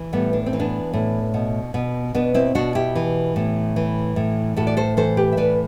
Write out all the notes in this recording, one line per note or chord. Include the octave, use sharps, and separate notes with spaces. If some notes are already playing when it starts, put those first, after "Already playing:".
Already playing: E3
A2 G3 B3
D4
C4
E3
B3 D4
A2
B2
B2
B2 B3 D4
C4 E4
B2 D4 F#4
E4 G4
E3
A2
E3
A2
A2 F#4 A4
D5
A4 C5
E3 A4 C5
G4 B4
E5
A2 B4 D5